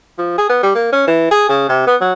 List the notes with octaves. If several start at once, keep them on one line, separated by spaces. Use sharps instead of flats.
F3
G#4
B3
G3
A#3
C#4
E3
G#4
C#3
C3
B3
F#3